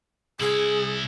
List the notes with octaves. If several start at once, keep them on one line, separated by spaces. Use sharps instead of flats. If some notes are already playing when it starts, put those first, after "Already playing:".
C2 E4 G#4